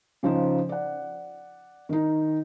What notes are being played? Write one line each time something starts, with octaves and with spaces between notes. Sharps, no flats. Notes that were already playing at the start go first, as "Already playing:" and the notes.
C#3 F3 D#4 C5
D5 F#5
D#3 D#4